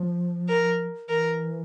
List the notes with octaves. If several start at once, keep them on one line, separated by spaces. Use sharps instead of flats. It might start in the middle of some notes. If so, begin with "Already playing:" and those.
Already playing: F3
A#4
E3 A#4